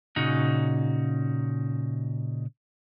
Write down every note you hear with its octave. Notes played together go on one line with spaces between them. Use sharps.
A#2 C#3 C#4 D#4 F#4